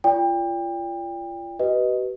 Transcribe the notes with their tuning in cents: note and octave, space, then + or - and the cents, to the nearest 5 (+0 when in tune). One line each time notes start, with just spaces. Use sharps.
F4 -30 D5 -25 G5 +30
G4 -45 B4 +0 D#5 +0